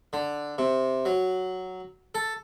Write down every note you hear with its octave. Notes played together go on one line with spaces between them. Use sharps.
D3
C3
F#3
A4